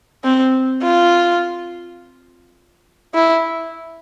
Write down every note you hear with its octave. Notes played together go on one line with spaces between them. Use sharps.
C4
F4
E4